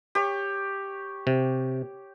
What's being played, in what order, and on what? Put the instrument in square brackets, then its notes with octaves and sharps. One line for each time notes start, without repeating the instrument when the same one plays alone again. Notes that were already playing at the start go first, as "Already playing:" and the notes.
[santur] G4 C#5
[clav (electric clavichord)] C3